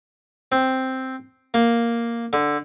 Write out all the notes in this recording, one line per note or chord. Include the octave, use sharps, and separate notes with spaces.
C4
A#3
D3